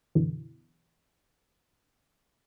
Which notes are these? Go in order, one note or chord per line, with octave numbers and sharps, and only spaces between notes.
F#2 B2 D3 E3